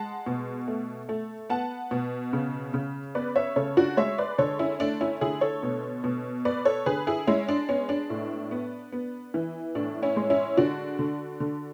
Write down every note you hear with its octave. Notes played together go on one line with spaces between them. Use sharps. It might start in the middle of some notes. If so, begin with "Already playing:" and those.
Already playing: G#3 F#5 A5
B2
A3
A3
B3 F#5 A5
B2
C#3
C#3
B3 B4 D5
C#5 E5
C#3 A4 C#5
D4 F#4
G#3 C#5 E5
B4 D5
D3 A4 C#5
C#4 E4
A3 D4
C#4 E4
D3 E4 G#4
A4 C#5
B2
B2
B3 B4 D5
A4 C#5
D3 G#4 B4
E4 G#4
G#3 C#4 E4
D4
B3 C#4
D4
A2
B3
B3
E3
A2 D4
C#4 E4
G#3
C#4 E4
D3 D4 F#4
D3
D3